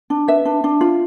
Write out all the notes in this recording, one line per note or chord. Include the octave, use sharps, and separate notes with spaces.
D4
B4 E5
D4
D4
F4